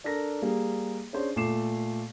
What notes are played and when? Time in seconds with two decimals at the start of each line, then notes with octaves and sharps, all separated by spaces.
0.04 D4 A4 A#4 A#6
0.42 G3 A#3 G#4
1.13 C#4 D4 G#4 C5
1.36 A#2 A3 D6 C7 E7